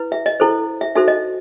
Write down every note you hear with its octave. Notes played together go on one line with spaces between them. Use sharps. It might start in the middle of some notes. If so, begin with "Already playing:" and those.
Already playing: E4 B4
E5
D#5
E4 A4 C5
E5
D#4 F#4 A4 C5 E5
D#5